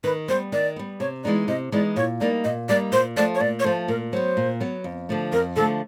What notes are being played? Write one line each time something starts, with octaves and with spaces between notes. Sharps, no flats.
D#3 B4
G3 B3 C5
D#3 D5
G3 B3
C3 C#5
E3 G#3 B3 D#4 D5
C3 D#5
E3 G#3 B3 D#4 D5
A#2 C#5
G3 A#3 D#4 D5
A#2 D#5
G3 A#3 D#4 D5
A#2 C5
F3 A3 D5
C#5
A#2 D5
C#5
F3 A3 C5
A#2 A#4
F#3 B3 C5
A#2
F#3 B3
F2
D3 F3 A3
F2 A#4
D3 F3 A3 A4